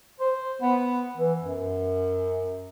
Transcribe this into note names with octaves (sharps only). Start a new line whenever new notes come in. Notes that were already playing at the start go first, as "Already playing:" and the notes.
C5
B3
E3
F#2